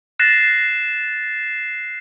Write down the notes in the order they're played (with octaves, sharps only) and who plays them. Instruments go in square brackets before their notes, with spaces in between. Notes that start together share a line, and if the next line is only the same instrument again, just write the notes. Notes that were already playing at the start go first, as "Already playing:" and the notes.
[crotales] F#6 A6 A#6 C7 E7